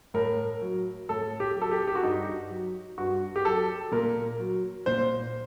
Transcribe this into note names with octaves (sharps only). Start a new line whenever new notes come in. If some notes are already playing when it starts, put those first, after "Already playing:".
A2 A#4
F#3
A2 A4
G4
F#3
A4
G4
G4
F#4
G2 D#4
F#3
G2 F#4
G4
F#3 A4
A#2 A#4
F#3
A#2 C5